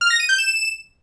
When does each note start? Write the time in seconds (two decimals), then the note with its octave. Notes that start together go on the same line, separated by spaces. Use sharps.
0.01 F6
0.10 A#6
0.20 D#7
0.29 G6
0.38 E7